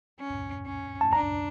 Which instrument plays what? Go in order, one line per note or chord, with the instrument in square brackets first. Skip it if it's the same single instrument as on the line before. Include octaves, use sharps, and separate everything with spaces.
[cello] C#4
C#4
[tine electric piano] A5
[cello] D4 [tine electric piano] A#5